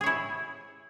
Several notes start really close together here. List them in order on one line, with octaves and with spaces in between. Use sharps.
G#4 C#5 E4